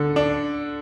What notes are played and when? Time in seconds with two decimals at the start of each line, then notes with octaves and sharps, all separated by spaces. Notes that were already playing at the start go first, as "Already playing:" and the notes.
Already playing: D3
0.16 D4